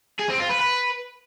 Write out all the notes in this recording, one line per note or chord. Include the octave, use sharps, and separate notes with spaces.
G#4
C4
F4
B4
B4